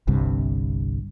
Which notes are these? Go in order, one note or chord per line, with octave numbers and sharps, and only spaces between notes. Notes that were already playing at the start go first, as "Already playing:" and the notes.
G1 C2 G2 C3